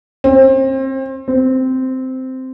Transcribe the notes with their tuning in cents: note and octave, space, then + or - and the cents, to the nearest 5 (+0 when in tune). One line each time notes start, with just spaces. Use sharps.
C4 +30
C4 -10